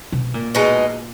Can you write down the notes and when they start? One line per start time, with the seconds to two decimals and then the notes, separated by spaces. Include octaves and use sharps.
0.12 B2
0.34 A#2
0.55 B2 G#3 D#4